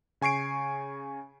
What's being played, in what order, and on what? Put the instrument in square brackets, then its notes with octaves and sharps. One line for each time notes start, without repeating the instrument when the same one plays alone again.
[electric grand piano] C#3 G#5 C#6 C7 D7